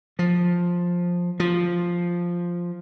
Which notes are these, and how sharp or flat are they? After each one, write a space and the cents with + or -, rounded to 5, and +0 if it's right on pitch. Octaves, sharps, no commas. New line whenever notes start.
F3 +10
F3 +0